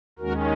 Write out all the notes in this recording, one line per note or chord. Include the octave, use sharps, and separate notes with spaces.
D#2 D#3 G#3 C#4 F#4 A#4